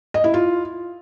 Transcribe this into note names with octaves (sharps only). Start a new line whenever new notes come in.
D#5
E4
F4